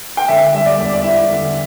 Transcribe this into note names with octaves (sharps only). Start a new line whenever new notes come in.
G5
D3 E5
G3 E5
D5
E2
D5
E4 E5
D3